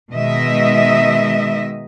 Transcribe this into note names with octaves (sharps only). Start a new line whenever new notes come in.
B2 D#3 G#3 D#5 E5